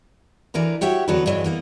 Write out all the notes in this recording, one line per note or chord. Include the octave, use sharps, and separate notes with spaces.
D3 E3 A#4 B4 A#5
F#4 G4 C#5 E5 F#5
E2 D3 F#3 F#4 A4 B4
G2 D3 E3 F#3 G#3
E3 A#3 B3